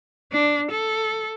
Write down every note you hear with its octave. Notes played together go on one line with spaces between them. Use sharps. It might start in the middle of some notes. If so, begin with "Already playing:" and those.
D4
A4